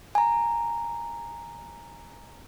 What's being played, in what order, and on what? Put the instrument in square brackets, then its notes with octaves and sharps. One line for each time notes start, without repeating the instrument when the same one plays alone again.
[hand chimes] G#5 A#5